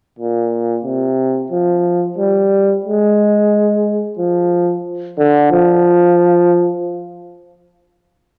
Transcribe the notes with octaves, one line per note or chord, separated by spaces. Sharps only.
A#2
C3
F3
G3
G#3
F3
D3
F3